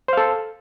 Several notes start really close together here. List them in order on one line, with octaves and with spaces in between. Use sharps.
C5 F5 A4